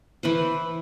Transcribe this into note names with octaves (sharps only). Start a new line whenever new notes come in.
E3 B4 C5